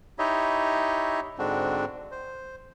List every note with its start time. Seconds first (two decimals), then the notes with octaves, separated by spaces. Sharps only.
0.19 D#4 E4 G4 C#5 D#5 E5
1.38 G#2 D3 C4 D4 F#4
2.12 C5